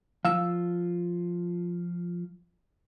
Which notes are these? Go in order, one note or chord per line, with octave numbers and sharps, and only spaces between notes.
F3 F4 F5 E6